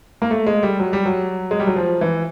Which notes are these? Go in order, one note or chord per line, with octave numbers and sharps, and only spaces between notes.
A#3
A3
G#3
G3
F#3
G3
F#3
G#3
G3
F#3
F3
E3